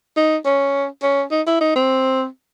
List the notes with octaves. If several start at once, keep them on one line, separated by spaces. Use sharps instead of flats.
D#4
C#4
C#4
D#4
E4
D#4
C4